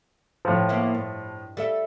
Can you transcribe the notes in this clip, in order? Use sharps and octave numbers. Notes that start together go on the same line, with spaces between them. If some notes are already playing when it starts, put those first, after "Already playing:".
A2 F3
A#3 B3 E4
G2
G3 A4 E5